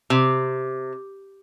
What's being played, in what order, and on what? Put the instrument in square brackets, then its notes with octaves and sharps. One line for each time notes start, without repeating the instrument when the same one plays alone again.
[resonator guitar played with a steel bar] C3